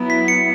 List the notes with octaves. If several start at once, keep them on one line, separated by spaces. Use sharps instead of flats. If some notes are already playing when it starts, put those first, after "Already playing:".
Already playing: F#3 B3 E4
B6
C#7